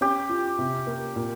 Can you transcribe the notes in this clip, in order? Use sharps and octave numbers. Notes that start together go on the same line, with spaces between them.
C#4 G4
F4
C3
A#3
A#2